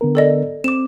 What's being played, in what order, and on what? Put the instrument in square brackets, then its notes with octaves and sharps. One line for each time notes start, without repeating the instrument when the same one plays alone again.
[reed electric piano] D3 B3 A#4
[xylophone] A4 D5 D#5
[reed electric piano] C4 [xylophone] D6 E7